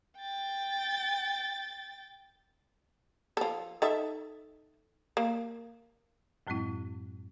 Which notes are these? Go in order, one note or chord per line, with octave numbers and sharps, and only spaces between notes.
G5 A6
F3 A4
D#4 A4 E5
A#3
F#2 A2 F#3 G#3 C4 E4